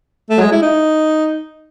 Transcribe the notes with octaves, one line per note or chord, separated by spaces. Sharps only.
A3
F#3
G#3
E4
D#4